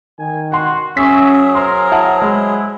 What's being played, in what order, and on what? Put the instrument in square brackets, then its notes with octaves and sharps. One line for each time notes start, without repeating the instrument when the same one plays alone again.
[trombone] D#3 [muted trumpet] G#5
[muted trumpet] F#4 [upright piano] F#5 C6
[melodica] F#3 G#4 [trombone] C#4 [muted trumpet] E5 [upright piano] C#6 B6
[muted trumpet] A#4 [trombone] C5 [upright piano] C6
[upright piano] E4 F#5 A5
[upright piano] G#3 [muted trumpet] E4